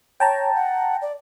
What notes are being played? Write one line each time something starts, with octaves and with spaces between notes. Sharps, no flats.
C#5 G5 A5 A#5
F#5
D5